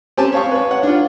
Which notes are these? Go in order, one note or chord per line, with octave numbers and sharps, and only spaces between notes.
C4 C#4 G4 G#5 A5
C#5 F5 C#6
B4 C#5
F#5
D4 F4